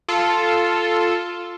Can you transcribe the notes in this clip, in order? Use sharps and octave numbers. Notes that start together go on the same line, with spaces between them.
F4 A4